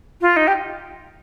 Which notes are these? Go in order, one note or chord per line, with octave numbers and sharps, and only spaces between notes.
F4
D#4
G4